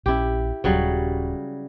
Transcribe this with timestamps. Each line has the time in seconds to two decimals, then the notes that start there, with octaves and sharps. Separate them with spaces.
0.06 A#1 C#4 E4 G4
0.64 D#1 G#1 C#3 F#3 G3